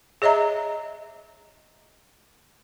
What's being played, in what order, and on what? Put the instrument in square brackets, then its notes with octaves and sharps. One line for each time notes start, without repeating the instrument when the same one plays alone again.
[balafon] G#4 C#5 D#5 E5 A#5